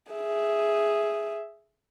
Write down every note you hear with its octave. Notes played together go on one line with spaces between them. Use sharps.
G#4 E5